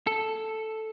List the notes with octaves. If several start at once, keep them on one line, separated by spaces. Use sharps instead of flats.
A4